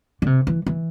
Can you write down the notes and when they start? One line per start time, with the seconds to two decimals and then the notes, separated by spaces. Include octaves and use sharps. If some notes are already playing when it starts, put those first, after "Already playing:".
0.22 D3
0.26 C3
0.47 E3
0.66 E3